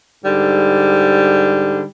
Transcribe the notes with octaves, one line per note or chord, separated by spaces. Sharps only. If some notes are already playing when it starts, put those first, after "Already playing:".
G#2 D3 G3